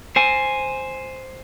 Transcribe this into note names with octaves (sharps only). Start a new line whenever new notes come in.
C5 G#5